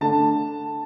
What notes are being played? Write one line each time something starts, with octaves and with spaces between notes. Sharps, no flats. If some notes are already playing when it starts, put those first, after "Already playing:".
D3 A3 D4 A5